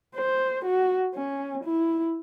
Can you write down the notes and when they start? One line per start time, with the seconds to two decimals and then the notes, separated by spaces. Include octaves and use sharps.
0.15 C5
0.65 F#4
1.15 C#4
1.64 E4